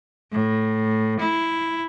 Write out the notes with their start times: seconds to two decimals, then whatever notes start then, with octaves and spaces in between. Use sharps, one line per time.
0.32 A2
1.19 E4